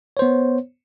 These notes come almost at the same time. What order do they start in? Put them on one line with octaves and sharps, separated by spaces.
C#5 C5 B3